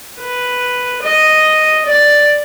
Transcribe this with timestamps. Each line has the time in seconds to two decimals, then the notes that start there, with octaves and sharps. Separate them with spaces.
0.19 B4
1.02 D#5
1.86 D5